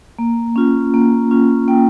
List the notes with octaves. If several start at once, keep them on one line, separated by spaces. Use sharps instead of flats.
A#3
C#4 F4
A#3
C#4 F4
A#3 G5